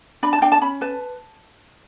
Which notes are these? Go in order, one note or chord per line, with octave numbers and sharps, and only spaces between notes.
D4 B5
A5
D4 G5
A5
C#4 B5
B4 A5